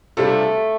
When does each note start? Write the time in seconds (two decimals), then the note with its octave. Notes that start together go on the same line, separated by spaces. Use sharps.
0.17 C3 G3 A3 D4 F4 A4